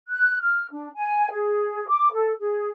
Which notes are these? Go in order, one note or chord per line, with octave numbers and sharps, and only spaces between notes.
F#6
F6
D4
G#5
G#4
D6
A4
G#4